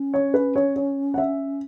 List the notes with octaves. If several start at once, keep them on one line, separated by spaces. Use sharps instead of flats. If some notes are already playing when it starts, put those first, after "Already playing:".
Already playing: C#4
C#5
B4
C#5
C#5
F#5
E5